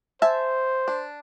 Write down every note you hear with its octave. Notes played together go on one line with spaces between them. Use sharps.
C5 E5 G#5 A5
D4